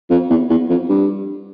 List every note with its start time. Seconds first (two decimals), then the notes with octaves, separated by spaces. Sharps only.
0.10 F2
0.30 E2
0.50 E2
0.69 F2
0.89 G2